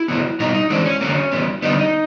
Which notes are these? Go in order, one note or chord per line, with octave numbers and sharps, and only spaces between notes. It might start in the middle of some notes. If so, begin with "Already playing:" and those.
Already playing: E4
C#3 F#3 B3
B2 G3 B3 D#4
D#4
E3 G#3 C4 D4
C#4
D3 F#3 A#3 C#4
C#3 E3 G3 B3
D3 G3 B3 D#4
D#4